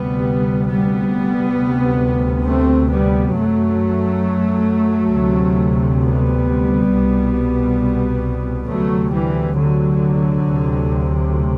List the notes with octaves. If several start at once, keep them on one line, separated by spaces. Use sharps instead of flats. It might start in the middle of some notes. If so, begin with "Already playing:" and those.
Already playing: D2 C3 G3 B3
G3 B3
D2 C3
A3 C4
G3 B3
F#2 F#3 A3
D2 C3
G3 B3
C2 B2
D2 C3 F#3 A3
E3 G3
D3 F#3
D2 C3